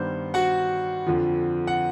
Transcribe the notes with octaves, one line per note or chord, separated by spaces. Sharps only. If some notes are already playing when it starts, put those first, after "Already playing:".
Already playing: G2 D#3 G3 B3 C5
F#4 F#5
F2 D3 F3
F#5